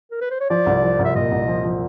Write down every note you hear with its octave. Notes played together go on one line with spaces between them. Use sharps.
A#4
B4
C5
C#5
F3 D5
C2
F3
C2
E5
A#2 D#5
C2
F3
F3